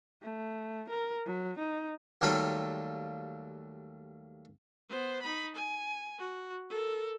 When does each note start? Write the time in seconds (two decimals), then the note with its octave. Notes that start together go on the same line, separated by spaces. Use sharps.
0.22 A3
0.89 A#4
1.27 F#3
1.58 D#4
2.21 D#2 F#3 G3 A3 F4 B5
4.89 B3 C5
5.22 D#4 B5
5.55 G#5
6.18 F#4
6.70 A4 A#4